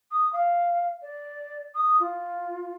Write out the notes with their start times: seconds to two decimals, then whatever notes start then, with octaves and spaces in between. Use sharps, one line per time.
0.11 D#6
0.33 F5
1.02 D5
1.75 D#6
2.00 F4